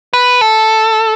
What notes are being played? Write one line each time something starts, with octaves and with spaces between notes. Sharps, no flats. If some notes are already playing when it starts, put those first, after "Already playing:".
B4
A4